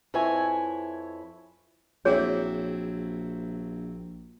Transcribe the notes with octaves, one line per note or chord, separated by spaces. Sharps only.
F2 E4 B4 C#5 G#5
A#1 F#3 C4 E4 G#4 C#5